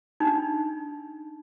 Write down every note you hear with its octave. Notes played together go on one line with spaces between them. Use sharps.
D4 D#4